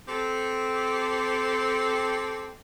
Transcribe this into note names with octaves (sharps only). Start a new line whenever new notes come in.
C4 G4 A4